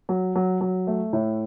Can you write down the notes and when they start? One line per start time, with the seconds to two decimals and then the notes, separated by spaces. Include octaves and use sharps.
0.09 F#3
0.35 F#3
0.61 F#3
0.87 A3
1.13 A2